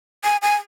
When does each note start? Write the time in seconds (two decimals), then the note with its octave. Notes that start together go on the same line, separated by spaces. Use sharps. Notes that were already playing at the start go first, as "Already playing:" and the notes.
0.24 G#5
0.42 G#5